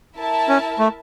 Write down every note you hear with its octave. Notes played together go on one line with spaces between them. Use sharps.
E4 A#4 E5 A5
C#4
A3